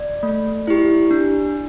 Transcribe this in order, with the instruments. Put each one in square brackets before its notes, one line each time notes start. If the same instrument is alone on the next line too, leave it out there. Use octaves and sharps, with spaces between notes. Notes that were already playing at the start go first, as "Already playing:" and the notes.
Already playing: [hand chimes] D5
A3
E4 G4
D4